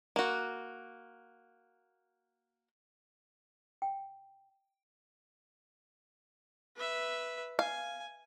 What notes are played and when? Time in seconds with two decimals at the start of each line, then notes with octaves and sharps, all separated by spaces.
0.16 A#3 F#4
3.82 G5
6.75 B4 E5
7.59 F5 G#5